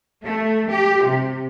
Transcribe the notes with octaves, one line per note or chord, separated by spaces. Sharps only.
A3
G4
C3